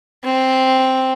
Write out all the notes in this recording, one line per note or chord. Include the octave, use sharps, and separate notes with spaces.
C4